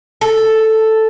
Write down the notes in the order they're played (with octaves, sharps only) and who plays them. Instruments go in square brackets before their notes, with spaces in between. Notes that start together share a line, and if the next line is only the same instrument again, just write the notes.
[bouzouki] A4